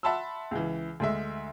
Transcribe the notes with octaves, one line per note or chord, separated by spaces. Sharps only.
E5 F#5 A5 B5 C6 E6
C#2 E3
D2 G#3 E5